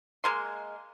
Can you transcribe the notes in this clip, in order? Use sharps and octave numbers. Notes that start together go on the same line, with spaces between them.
G#3 A#3 C6